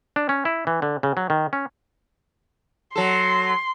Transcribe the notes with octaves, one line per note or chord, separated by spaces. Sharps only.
D4
C#4
E4
E3
D3
C#3
F#3
D#3
C#4
F#3 A4 C6